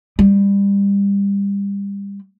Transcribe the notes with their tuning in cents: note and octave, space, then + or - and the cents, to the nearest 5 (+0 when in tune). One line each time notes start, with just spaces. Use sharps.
G3 +30